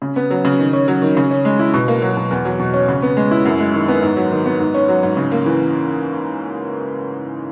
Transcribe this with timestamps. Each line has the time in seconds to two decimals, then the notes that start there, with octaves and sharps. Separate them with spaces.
0.02 C#3
0.16 B3
0.31 F#3
0.45 C#3
0.59 D#3
0.73 C#4
0.88 F#3
1.02 D#3
1.17 C#3
1.31 C#4
1.45 G#3
1.59 E4
1.74 B2
1.88 A#3
2.02 F#3
2.17 B2
2.31 E2
2.45 F#3
2.59 B2
2.74 C#4
2.88 C#3
3.02 B3
3.17 G#3
3.31 E4
3.45 F#2
3.60 G#3
3.74 D#3
3.88 B3
4.03 G#2
4.16 F#3
4.31 D#3
4.46 B3
4.60 G#2
4.74 C#4
4.89 F#3
5.03 G#2
5.17 C#3
5.32 A#3
5.46 E3